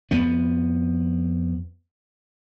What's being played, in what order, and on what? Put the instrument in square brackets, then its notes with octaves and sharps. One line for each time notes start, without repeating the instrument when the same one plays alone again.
[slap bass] F2 F3 B3